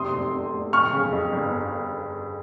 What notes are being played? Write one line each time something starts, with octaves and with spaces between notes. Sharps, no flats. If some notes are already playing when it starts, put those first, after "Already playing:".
Already playing: F1 C3 C6 D#6
F1
F1
F1
F2 C#6 F6
C#3
F2
G1